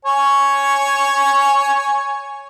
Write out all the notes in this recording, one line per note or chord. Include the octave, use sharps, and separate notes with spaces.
C#5 G#5